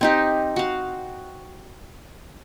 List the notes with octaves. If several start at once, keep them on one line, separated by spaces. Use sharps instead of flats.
C4 D#4 G4
F#4 F5